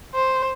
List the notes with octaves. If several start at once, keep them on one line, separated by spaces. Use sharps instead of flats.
C5